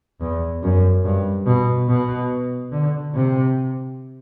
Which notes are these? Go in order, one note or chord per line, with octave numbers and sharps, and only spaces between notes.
E2
F#2
G2
B2
B2
D3
C3